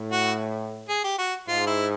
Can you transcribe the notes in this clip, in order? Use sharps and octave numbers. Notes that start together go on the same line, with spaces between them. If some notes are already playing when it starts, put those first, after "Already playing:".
Already playing: A2
F#4
G#4
G4
F#4
G#2 F4
E4